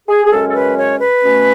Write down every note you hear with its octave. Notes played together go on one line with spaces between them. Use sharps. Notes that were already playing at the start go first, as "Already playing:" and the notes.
G#4
G#4
F#2 C#3 G#3 C#4 A4
A4
B4
C#5
B4
B2 A3 C#4